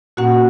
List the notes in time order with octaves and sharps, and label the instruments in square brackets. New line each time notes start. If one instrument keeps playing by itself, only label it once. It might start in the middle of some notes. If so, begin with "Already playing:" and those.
[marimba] A#2 A#3 C#4 F#4 F#5